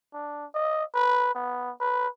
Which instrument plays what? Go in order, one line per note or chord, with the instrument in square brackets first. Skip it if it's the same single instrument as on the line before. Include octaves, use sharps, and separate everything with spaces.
[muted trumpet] D4
D#5
B4
B3
B4